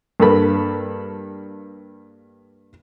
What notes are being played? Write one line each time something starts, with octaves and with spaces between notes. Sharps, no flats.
G2 A#3 A4 B5